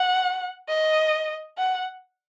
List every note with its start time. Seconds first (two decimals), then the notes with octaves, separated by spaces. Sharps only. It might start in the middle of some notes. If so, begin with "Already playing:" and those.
Already playing: F#5
0.68 D#5
1.57 F#5